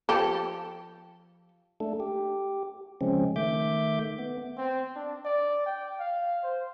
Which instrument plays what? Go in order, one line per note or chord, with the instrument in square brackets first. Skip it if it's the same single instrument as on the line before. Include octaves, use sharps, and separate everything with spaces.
[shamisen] F3 G4 A4
[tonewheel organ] A3 D4 A4
G4
C#3 F3 G#3 C4 C#4
D#3 A3 E5 D6 G6
B3
[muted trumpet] C4
D4
D5
G5
F5
C5